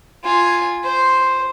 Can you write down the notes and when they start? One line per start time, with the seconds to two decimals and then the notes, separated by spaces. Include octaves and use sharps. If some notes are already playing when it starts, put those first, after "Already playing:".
0.24 F4 G#5
0.84 C5